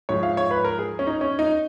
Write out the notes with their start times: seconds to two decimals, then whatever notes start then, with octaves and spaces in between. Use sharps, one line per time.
0.09 G#2 F3 G#3 C#5
0.23 F5
0.37 C#5
0.51 B4
0.64 A#4
0.79 G#4
0.99 C#4
1.07 D#4
1.21 C#4
1.39 D#4